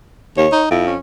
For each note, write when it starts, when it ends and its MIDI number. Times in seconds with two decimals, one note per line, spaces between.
0.37 0.47 39
0.37 0.62 73
0.52 0.66 63
0.71 0.95 41
0.71 0.83 64
0.87 0.98 61